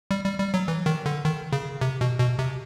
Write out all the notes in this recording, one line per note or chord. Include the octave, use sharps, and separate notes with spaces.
G3
G3
G3
F#3
E3
D#3
D3
D#3
C#3
C3
B2
B2
C3